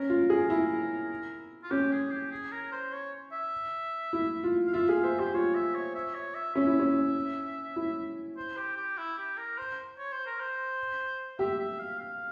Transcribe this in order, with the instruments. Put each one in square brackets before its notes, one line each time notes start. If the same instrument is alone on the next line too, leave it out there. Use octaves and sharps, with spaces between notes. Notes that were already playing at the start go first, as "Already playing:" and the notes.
Already playing: [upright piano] C#4 [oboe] A#4
[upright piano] F4
G#4
E4
[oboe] F4
[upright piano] C#4 [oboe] G4
[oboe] G#4
G4
G#4
A#4
C5
C#5
E5
[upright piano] E4
F4
[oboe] F5
[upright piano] F4 [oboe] E5
[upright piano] G#4 [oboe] F5
[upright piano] C5 [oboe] E5
[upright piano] G4 [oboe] C5
[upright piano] F4 [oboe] C#5
[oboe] E5
C#5
E5
C#5
E5
[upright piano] C#4 [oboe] E5
[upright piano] E4
C#4
E4
[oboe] C5
G4
G4
E4
G4
A#4
C5
C#5
C5
A#4
C5
[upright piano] G4 [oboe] E5
[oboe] E5
F5
F5